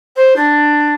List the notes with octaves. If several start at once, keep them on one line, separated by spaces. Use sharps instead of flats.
C5
D4